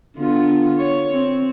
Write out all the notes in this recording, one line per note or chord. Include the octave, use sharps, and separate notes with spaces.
D3 B3 F4
C#5
C4